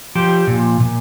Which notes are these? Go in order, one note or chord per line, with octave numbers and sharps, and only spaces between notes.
F3 G4
A#2
A#2